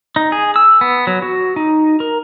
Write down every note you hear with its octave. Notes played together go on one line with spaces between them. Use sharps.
D#4
G#4
E6
B3
F#3
F#4
D#4
A#4